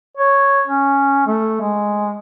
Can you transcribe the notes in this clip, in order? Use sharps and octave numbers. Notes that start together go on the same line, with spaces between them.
C#5
C#4
A3
G#3